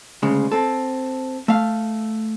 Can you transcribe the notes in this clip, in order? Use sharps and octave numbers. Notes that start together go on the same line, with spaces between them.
D2 C#3 G#3
C4 A4
A3 F5